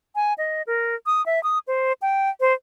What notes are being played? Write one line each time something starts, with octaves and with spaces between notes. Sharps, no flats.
G#5
D#5
A#4
D#6
E5
D#6
C5
G5
C5